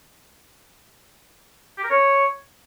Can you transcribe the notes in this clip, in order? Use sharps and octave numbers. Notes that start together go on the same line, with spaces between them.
G4
A#4
C#5